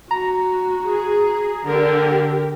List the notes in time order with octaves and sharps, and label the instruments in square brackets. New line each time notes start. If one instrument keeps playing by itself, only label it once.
[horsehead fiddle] F#4 [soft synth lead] A#5
[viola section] G#4
[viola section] D3 [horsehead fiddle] G4 A#4